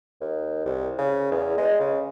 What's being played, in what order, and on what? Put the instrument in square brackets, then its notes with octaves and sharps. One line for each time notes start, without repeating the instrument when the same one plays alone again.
[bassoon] D#2
C2
C#3
E2
G#3
C#3